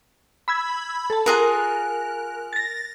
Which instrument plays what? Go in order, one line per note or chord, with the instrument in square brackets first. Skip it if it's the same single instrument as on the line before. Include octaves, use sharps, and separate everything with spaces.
[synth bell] B5 E6 G#6
A4 A5
[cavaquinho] F4 G#4 F#5 [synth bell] A#4 F#6
[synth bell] A6 A#6